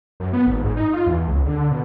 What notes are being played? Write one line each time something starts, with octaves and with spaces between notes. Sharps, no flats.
F#2
B3
G#1
G#2
D#4
F4
E2
C#2
D3
B2